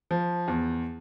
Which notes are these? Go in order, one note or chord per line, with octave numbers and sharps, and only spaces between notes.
F3
E2